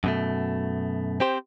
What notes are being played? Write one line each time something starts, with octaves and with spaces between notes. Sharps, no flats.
F#2 B2 A3
C4 G4 C5